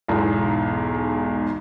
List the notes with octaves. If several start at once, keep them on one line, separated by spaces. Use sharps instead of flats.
B1 E2 G#2